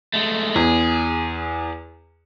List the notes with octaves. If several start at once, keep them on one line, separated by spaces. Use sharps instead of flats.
G#3 A3
E2 G#4